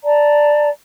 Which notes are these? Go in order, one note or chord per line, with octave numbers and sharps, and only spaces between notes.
D5 A5 A#5